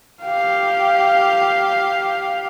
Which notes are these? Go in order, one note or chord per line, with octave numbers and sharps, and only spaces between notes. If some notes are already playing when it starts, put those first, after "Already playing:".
G4 F5